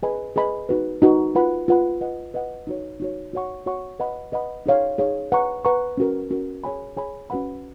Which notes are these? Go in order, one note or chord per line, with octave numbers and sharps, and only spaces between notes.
G#4 B4 D#5 G#5 B5
G#4 B4 D#5 G#5 B5
D#4 F#4 B4
D#4 F#4 B4
F4 B4 F#5 B5
F4 B4 F#5 B5
B4 D#5 F#5
B4 D#5 F#5
D#4 F#4 C#5
D#4 F#4 C#5
F#4 C#5 F#5 C#6
F#4 C#5 F#5 C#6
B4 D#5 F#5 B5
B4 D#5 F#5 B5
D#4 G#4 C#5 F5
D#4 G#4 C#5 F5
B4 F#5 A#5 C#6
B4 F#5 A#5 C#6
C#4 F#4 A#4
C#4 F#4 A#4
G#4 C#5 G#5 B5
G#4 C#5 G#5 B5
C#4 F#4 B4 F#5 B5